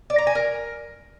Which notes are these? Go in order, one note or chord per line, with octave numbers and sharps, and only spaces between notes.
D5
A#5
G#5
A#4